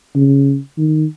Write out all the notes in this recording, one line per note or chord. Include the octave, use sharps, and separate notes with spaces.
C#3
D#3